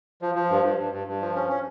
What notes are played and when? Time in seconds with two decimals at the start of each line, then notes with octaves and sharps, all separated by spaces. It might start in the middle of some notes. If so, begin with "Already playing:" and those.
0.22 F3
0.35 F3
0.50 G2
0.64 G2
0.78 G2
0.93 G2
1.07 G2
1.21 F3
1.36 C#4
1.49 C#4